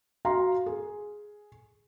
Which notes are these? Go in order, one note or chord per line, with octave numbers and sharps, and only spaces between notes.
F#4 F5 A#5 C6
G#4